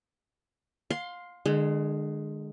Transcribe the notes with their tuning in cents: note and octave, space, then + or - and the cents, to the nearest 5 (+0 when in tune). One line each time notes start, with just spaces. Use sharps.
F5 +25 C6 +0
D3 +40 G#3 +0